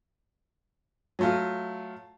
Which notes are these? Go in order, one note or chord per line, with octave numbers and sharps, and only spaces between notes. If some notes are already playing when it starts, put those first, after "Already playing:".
F#3 A3 F4